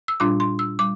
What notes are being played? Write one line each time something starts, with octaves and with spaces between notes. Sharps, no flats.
E6
A#2 G3 D4 F4 D6
C6
E6
G3 D6